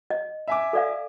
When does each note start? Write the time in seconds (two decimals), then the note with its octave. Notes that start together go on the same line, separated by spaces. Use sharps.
0.10 D#5
0.48 E5 G#5 D6
0.73 A4 D5 F5